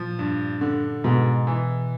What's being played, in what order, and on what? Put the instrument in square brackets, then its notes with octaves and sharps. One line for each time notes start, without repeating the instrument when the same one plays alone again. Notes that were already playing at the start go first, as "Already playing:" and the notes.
Already playing: [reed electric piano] A#2 [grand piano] F3
[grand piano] G2
D3
[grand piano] G#2 [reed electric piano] B2
[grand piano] E3